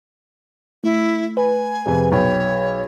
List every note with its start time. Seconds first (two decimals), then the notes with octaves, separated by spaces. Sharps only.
0.84 A3 E4
1.37 B4 G#5
1.86 F2 C3 G#4 B4
2.12 B1 C#5 G5 B5